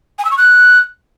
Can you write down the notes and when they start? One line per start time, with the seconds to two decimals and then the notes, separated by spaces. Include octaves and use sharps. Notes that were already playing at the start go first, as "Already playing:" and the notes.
0.19 G#5
0.25 E6
0.31 C#6
0.38 F#6